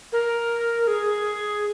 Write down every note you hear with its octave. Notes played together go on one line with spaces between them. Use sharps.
A#4
G#4